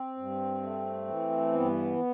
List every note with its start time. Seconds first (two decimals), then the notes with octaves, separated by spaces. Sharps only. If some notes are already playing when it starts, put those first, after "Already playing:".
Already playing: C4
0.17 G2
0.62 A3
1.08 E3
1.53 G2 B3